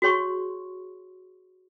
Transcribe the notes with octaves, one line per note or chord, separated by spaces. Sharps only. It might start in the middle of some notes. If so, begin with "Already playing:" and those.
F#4 G#4 C#5 C6 C#6